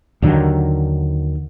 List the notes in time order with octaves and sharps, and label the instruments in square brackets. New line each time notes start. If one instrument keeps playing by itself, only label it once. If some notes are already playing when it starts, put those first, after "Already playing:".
[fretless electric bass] D#2 D3 D#3 F#3